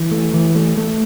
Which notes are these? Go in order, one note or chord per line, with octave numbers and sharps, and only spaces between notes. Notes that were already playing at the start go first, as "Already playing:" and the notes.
Already playing: E3
A3
E3
A3
A3